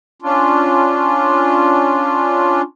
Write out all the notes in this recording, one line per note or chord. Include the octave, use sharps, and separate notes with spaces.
C#4 D4 F4